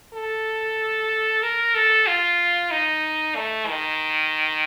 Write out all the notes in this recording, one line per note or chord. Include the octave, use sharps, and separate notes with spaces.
A4
A#4
A4
F4
D#4
A3
D#3